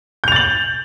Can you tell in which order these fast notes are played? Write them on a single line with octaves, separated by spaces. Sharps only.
G6 F7 A6 F#7